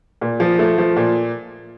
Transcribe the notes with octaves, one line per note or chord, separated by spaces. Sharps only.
A#2
F3
A3
F3
A#2